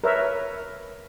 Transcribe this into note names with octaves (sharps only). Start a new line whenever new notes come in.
A#4 B4 C#5 E5